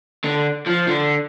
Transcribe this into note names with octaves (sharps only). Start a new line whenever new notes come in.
D3
F3
D3